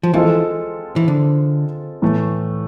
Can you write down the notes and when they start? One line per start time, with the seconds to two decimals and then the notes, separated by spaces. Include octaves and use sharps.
0.03 F3
0.14 E3 G#3 C4 F4 A4
0.96 E3
1.08 D3
2.02 A2 E3 A3